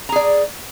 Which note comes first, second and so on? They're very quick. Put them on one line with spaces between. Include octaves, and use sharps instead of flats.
A#5 G#4 D5